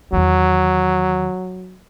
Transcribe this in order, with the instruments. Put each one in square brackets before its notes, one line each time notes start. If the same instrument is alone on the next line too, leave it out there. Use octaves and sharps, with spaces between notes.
[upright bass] E2 D#3 [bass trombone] F#3